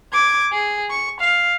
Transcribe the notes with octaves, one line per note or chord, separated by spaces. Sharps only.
D6 G#6
G#4
C#6
F5